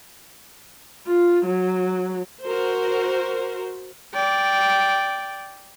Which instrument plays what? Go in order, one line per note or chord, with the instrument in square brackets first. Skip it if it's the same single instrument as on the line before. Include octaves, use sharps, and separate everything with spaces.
[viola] F4
F#3
[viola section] F#4 A#4 C5
[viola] D5 G5